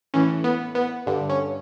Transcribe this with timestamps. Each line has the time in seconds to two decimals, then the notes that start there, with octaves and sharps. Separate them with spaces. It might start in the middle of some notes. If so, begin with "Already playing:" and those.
0.14 A2 E3 C#4
0.44 B3
0.75 B3
1.06 G2 D3
1.29 C#4